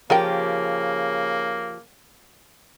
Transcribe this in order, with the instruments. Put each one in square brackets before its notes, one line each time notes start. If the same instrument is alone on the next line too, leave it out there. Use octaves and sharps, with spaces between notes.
[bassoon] C#3 [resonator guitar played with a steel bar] F3 G4 [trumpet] A#3 [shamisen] F4 A#4 G5